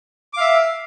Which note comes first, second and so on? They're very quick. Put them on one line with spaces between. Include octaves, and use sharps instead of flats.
D6 F5 E5